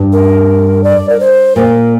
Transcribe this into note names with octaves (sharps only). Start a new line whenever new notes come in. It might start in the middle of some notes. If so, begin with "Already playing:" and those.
Already playing: G2
A#4
D5
A#4
C5
A#2 A#4